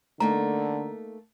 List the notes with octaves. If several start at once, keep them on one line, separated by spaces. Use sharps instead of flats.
D3 A3 A#3 D#4 A#5